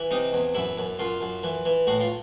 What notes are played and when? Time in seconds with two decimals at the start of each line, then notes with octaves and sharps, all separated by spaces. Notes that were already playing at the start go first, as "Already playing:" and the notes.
Already playing: E3
0.11 C3 D#4
0.33 E2
0.55 F#2 E4
0.78 F#2
0.99 F#2 F4
1.21 F#2
1.43 E3
1.65 E3
1.87 A2 F#4
2.00 F4